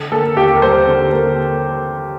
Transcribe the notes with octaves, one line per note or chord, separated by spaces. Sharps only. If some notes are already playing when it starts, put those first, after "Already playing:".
Already playing: D3
A#3 A4
D#2 G4
A#4
G3 C5
D3
A#3